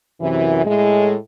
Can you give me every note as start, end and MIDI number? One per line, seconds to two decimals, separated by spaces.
0.21 0.63 42
0.21 0.63 48
0.21 0.63 52
0.65 1.15 45
0.65 1.15 56